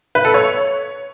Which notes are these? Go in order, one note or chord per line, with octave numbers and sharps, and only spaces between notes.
B4
A4
C#5